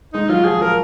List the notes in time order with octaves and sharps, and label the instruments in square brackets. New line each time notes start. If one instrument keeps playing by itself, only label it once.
[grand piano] G#3 [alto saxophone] D#4
[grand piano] F#3 [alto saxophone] F4
[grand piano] F3 [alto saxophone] G#4
[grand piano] F3 [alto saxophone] A#4